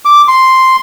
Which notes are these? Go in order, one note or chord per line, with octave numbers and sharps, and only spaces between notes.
D6
C6